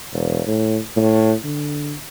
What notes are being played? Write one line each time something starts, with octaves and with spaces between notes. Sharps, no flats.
E1
A2
A2
D3